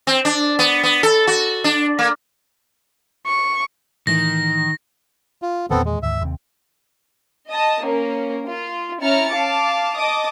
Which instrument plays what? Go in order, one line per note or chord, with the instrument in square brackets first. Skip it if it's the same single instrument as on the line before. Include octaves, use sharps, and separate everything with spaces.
[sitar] C4
D4
B3
B3
A4
F#4
D4
A#3
[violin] C#6
[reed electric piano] A2 E3 [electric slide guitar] D#3 [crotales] A#6
[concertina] F4
[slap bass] E2 A#2 D#3 [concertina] B3 C4 A4
[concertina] G#3
[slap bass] D2 G#2 D#3 [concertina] E5
[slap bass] D#2 C3 C4
[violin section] D#5 A5 D#6
A#3 C#4 A#4
F4
C#4 E4 A#5 F6 A6 C#7
F5 A5 D6
D#5 A5 D6 D#6